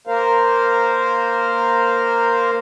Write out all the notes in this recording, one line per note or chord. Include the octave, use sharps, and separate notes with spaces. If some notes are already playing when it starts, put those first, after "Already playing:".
A#3 A#4 C5 F5